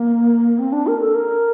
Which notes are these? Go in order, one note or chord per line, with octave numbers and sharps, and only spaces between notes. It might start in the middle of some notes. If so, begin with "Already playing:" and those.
Already playing: A#3
C4
D4
A#4
A4
A#4